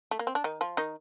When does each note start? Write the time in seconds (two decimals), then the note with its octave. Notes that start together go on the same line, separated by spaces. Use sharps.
0.11 A3
0.19 A#3
0.27 C4
0.35 D4
0.44 D#3 D#4
0.61 F3 F4
0.77 D#3 D#4